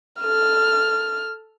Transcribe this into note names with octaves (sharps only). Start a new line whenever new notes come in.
A4 F6